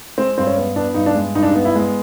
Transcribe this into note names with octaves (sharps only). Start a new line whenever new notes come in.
G#3 C4
G2 C4
C#4
B3
B3 D4
G2 D#4
D4
G#3
G2 D#4
D4
D#4
B3
E4
G#3